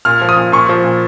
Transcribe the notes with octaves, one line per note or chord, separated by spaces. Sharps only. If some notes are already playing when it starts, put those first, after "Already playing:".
A#2 F6
F3
D#6
A#2
A#2 C#6
F3
A#2